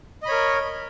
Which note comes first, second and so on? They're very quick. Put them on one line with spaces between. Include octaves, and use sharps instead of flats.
D#5 B5 C#5 A#4